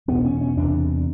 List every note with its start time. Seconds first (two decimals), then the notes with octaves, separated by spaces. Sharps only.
0.08 E2 B2 B3
0.24 C#4
0.41 C#4
0.57 E2 C3 D4